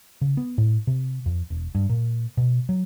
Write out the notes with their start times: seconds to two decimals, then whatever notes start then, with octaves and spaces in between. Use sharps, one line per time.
0.21 C#3
0.37 B3
0.58 A2
0.87 C3
1.26 F2
1.50 E1
1.75 G2
1.89 A#2
2.37 B2
2.69 F#3